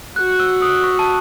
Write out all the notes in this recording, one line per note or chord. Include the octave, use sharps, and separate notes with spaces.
F#4 F#6
E6
D#6
C#6
A5